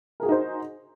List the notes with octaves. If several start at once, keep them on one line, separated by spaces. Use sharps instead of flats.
D#4 F#4 G#4 A#4 C5